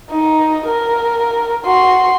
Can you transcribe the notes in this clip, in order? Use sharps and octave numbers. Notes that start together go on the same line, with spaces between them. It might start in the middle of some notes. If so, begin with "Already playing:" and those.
D#4
A#4
F#4 C6